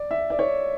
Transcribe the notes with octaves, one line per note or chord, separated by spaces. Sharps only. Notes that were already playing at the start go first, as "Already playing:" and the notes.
Already playing: D5
E5
D5
C#5